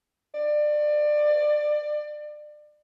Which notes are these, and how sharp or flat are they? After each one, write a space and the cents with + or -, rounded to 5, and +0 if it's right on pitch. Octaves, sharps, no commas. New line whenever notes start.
D5 +25